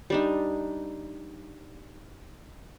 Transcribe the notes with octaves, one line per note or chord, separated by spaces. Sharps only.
G3 D4 D#4